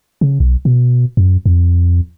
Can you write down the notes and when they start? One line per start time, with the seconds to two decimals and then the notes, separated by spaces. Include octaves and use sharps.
0.21 C#3
0.40 B1
0.65 B2
1.17 F#2
1.46 F2